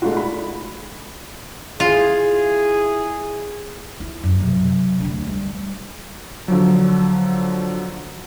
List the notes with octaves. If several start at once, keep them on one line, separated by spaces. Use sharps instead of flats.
G#3 A3 D4 D#4 F4 F#4
B5
E4 F4 G#4
E4
F#2
C3 F#3
D2 D4
G3
D3 F3 F#3